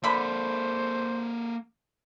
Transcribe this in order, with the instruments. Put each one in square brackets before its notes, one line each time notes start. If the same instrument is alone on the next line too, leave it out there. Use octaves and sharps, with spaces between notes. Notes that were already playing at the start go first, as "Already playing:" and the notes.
[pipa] D3 B5 [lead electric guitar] A#3 A4 [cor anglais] C5